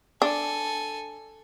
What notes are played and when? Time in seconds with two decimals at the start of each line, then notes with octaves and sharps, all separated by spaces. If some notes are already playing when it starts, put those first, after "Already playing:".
0.22 D4 A4 G#5